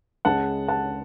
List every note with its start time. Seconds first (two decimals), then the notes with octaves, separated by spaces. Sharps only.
0.25 C#2 C#3 G#3 F#5 A5
0.68 F#5 A5